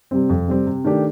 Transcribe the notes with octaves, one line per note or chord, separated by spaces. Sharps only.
C3 G3 C4
F2
C3 G3 C4
C3
D#3 A3 D4 G4